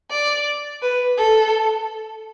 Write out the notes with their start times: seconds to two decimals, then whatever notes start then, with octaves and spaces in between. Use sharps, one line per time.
0.10 D5
0.82 B4
1.18 A4